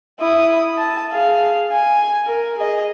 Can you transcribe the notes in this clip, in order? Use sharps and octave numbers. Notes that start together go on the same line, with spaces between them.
E4 D#6
A5
G#4 F5
G#5
A#4
G#4 D#5